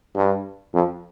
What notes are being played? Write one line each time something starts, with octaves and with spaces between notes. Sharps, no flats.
G2
F2